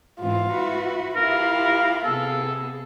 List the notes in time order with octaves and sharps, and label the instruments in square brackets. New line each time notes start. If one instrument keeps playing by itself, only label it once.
[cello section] G#2 E3 C4 [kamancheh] F4
[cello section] E4 F#4 B4
[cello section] E4 F4 G4 [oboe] A#4 [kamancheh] F5
[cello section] C3 B3 G#4 [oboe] A4